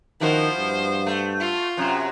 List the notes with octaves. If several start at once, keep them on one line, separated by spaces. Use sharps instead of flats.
D#3 F3 E4 F#4 C5
G2
A3
F4
F#2 C3 F#3